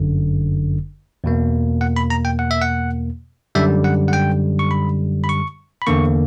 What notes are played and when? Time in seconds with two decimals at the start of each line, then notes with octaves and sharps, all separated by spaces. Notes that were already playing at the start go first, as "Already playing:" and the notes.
Already playing: G1 F#2 D3
1.24 E2 B2 A#3
1.81 F#5
1.96 B5
2.10 A#5
2.25 G5
2.39 F#5
2.51 E5
2.62 F#5
3.55 F#2 D3 G3 E5
3.84 F#5
4.08 F#5
4.13 G5
4.59 C#6
4.71 B5
5.24 B5
5.29 C#6
5.82 B5
5.87 E2 D3 A#3 C#6